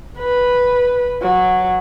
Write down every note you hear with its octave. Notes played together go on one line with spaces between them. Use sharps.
B4
F#3